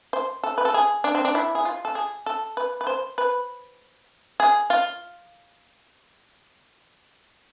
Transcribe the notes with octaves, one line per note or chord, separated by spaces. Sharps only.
C5
A4
B4
A4
G#4
D4
C4
D4
E4
G#4
F4
A4
G#4
A4
B4
B4
C5
B4
G#4
F4